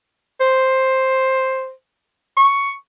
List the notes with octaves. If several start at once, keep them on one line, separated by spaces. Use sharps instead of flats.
C5
C#6